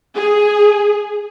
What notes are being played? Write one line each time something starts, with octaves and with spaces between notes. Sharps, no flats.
G#4